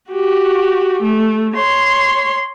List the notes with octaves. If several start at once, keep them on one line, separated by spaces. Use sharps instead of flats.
F#4 G4
A3
C#5 C6